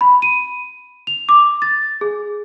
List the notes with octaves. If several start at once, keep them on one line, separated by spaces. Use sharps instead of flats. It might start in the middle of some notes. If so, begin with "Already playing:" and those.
B5
D#7
F7
D6
A6
G#4